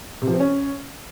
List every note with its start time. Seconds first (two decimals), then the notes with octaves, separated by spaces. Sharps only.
0.22 C3
0.28 F3
0.34 C4
0.40 C#4